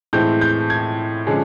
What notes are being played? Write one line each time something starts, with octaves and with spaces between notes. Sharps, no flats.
A2 E3 G#3 C4 G6
G6
G#6
D3 F3 G#3 C#4